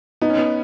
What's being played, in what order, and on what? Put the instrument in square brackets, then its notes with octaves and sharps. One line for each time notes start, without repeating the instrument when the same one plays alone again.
[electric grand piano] B3 [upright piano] D#4
[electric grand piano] C#4
B3